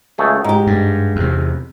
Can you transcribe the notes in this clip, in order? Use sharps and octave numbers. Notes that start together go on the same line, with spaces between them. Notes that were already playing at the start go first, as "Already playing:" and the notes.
C#2 A3 G#4
G#2 D#4 G4
G2
E2 C3